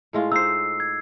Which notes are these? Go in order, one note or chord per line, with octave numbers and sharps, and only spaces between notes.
A2 G#3 F4
D#4 C5 E6 C7
G#6